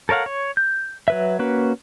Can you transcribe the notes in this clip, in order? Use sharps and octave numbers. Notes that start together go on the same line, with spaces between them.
A4 A#4 C#5 F5 F#5
C#5
G6
F#3 B4 E5
A#3 C#4 F#4 B4